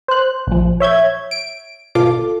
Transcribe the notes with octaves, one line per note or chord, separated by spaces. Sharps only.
C5 F#6
A#1 F3
C#5 E5 G6 G#6
D7
G#1 B2 F4 A4 D6